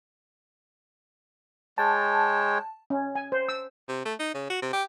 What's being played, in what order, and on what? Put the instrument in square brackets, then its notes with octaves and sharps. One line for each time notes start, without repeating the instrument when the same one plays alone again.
[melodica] G#3 C#5 G5 [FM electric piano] A5
[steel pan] C#4
G#5
C5
E6
[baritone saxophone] C3
A3
D#4
C#3
F#4
C3
G4